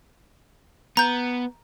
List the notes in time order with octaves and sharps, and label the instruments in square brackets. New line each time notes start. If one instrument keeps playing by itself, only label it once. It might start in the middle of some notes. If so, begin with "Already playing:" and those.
[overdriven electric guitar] B3 [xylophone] A#5 G6